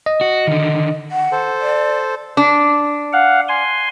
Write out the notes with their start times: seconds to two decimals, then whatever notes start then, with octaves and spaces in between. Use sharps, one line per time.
0.06 D#5
0.21 F#4
0.47 D3 D#3
1.11 F#5
1.32 A4 C5
1.61 D5
2.37 D4
3.12 F5 F#5
3.48 G#5 C6